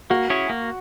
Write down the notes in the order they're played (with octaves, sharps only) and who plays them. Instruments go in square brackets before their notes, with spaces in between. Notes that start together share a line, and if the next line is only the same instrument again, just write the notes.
[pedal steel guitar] A#3 [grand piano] F#4
[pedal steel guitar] C#4 E4 G#4 C#5
A#3